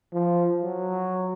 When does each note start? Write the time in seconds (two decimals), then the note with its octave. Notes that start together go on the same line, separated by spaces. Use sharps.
0.13 F3
0.61 F#3